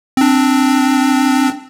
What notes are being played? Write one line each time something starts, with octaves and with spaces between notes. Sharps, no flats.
C4 D4